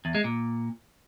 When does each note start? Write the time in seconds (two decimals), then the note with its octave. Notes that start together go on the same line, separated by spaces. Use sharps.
0.05 E2
0.15 G#3
0.24 A#2